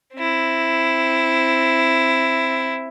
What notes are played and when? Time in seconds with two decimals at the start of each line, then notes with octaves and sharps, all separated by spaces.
0.16 C4 E4